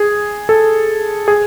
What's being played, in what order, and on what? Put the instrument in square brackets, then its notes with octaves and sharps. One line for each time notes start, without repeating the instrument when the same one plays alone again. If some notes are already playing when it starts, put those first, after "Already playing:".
Already playing: [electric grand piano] G#4
A4
G#4